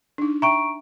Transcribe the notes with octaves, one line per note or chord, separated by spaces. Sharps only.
D4 D#4
E5 G5 A#5 C#6 D7